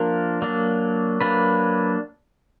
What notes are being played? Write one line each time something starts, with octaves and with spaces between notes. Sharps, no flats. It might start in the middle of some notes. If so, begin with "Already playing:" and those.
Already playing: F3 A#3 D4 A#4
F#3 A#3 D4
F#3 A#3 D4 B4